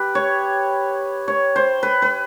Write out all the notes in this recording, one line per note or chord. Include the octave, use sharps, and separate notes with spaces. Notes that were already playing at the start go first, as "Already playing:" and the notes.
Already playing: G4 B4
C#5
C#5
C5
B4
B4